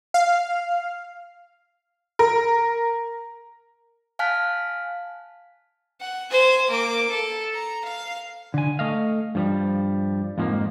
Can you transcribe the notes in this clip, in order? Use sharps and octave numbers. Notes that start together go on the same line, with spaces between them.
F5
A#4
F5 G#5 A5 F6 F#6 B6
F#5
C5 G#5
A#3 D6
A4
A#5
F5
D3 G#5
A3 D#5 F5
G2 F3 G3
F2 G#2 F3 G#3 A#3